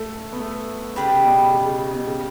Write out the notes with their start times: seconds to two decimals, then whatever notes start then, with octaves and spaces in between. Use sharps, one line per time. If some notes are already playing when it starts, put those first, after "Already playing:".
Already playing: A3 C#4 A4
0.32 B3
0.40 A3
0.96 C#3 G3 D4 G4 B4
1.13 C#3
1.24 B2
1.52 C#3
1.65 C#3
1.79 C#3
1.93 B2
2.07 C#3